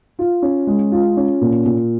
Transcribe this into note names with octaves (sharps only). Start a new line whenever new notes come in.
F4
C#4
G#3
F4
C#4
A#2
A#2